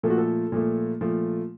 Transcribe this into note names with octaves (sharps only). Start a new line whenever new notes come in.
A#2 F3 A3 A4
F#4
A4
A#2 F3 A3
A#2 F3 A3